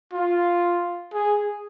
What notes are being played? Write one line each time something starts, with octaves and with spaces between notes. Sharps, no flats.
F4
G#4